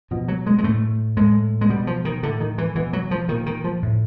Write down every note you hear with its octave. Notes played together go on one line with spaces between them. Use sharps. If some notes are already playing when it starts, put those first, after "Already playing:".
B2 F3
F#3
G#3
G#3
A2 A3
A2 G#3
G#3
B2 G3
F3
D#3
A2 D3
D#3
E3
B2 E3
F#3
F3
A#2 D#3
D#3
F3
A2